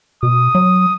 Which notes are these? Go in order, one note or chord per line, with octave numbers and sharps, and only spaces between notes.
B2 D#6
F#3